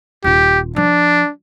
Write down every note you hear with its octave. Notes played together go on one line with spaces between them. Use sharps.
D#1 F4 G4
F3 D4